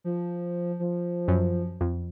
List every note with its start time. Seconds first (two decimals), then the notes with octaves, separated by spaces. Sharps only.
0.04 F3
0.79 F3
1.28 F#2
1.81 F2